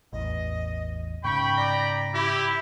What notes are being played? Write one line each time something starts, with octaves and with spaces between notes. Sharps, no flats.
A1 E2 D#5
G#2 C#3 G5 B5 C#6
D5 A#5
E4 G4 B5